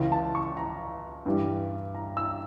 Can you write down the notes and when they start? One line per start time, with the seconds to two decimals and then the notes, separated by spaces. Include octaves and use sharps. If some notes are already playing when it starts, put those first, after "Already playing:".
Already playing: C#2 C#3 E3
0.12 A5
0.35 C#6
0.57 A#5
1.26 G2 E3 G3
1.95 A#5
2.17 E6